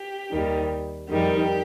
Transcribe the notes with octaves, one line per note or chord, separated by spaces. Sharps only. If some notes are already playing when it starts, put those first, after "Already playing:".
Already playing: G4
D#2 D#3 G3
F2 D#3 G3 G4